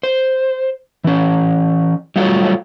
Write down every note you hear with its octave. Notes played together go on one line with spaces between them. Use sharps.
C5
E3 C#4
F#3 G3 A3 F4 F#4 C#5